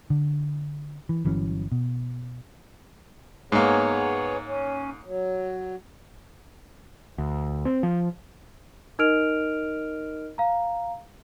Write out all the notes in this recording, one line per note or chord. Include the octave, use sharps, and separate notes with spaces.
D3
E3
G1 E3 F#3 C#4
B2
G#2 A#3 B3 G#4 C#5
C#4
F#3
D2
C4
F3
D#4 A#4 D#5 F6 D7 F7
F5 A#5